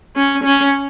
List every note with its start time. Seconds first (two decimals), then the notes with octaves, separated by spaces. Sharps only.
0.16 C#4
0.43 C#4